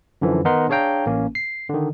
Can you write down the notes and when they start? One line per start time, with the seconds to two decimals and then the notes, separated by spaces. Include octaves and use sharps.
0.22 F#2 D3 E3 F3
0.45 D#3 B3 D#4 A#4 F#5 C6
0.69 D4 G#4 C#5 F5 G5 A#5
1.06 A1 A#3 C#4
1.35 C7
1.70 D3 D#3